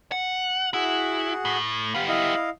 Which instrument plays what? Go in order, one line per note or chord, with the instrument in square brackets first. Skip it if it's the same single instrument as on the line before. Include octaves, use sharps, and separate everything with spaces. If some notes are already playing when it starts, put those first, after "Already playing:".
[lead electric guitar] F#5
[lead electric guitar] E4 [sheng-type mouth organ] F#4 G#4 F#5
[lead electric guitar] A2
[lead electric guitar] B3 G4 [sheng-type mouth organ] F5
[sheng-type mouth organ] E4 D#5 F5